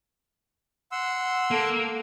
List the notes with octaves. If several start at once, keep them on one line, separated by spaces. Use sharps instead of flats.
F#5 C6 E6
A#3 A4